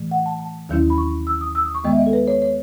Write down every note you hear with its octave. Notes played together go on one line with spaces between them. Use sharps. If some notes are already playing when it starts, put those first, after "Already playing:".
Already playing: A2 E3 A3
F#5
A5
A5
D#2 D#3 F#3 C#4 E4
B5
C#6
E6
D#6
E6
D#6
C#6
F#2 D#3 G#3 B3 D#5
E5
D#5
A4
B4
C#5
C#5